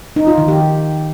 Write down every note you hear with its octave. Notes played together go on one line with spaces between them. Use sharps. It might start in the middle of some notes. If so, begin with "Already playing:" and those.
D#4
F4
D#3
G4